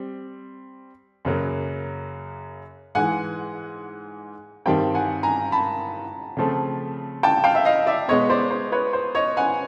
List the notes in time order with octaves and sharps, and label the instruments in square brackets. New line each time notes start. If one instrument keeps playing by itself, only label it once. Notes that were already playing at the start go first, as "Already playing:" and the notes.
Already playing: [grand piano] G3 C4
F#2 C#3 F#3 A#3
[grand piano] G#2 E3 G#3 [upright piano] F#5 G#5
[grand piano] G2 D#3 G3 C4 [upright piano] G5 A5
[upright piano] F#5 G#5
G#5 A#5
A5 B5
[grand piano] C#3 F3 A3 C4
[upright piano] G5 A5
F5 G5
E5
D#5 F5
D5 E5
[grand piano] B2 G#3 B3 [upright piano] C#5 D#5
[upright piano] C5 D5
C5
B4 C#5
C5
C#5 D#5
F#5 G#5